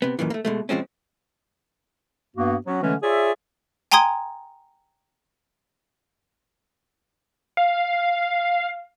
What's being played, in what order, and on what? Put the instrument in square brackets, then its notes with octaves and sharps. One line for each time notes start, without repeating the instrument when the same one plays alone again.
[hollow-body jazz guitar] C3 B3
F#2 A#2 D#3 E3
A3 A#3
B2 G#3 A3
B2 F3 G#3 C4 C#4
[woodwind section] G2 A#3 B3 F#4
F#3 B3 C#4 F#4
D3 E3 F#3 G#3 A3 C#4
F4 G#4 C#5 D5 E5
[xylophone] G5 G#5 A#5 C6 D#6 G#6
[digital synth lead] F5